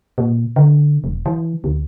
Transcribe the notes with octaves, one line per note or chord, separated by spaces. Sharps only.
A#2
D3
E1
E3
D2